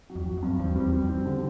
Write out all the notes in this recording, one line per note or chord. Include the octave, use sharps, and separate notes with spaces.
F#3
F2
F#3
F#2
G2
E2 C4
G3
E2
G3
F2
C4
D3